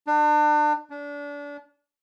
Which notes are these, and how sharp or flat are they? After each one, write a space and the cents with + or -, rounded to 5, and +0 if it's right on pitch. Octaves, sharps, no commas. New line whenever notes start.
D4 +35
D4 -30